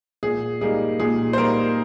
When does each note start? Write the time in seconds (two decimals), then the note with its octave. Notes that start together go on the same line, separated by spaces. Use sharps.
0.23 A#2 G#4
0.61 G3 A#3 D#4 G#4
1.00 A#2 G#4
1.33 C5
1.38 G3 A#3 D#4 A#4